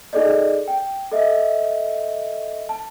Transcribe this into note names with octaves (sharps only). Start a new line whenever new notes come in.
D#4 G#4 A4 D5 D#5
G5
A4 D#5 E5
A5